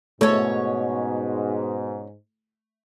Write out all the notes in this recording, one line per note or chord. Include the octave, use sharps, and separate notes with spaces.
G#2 B2 A3 C#4 A4 C#5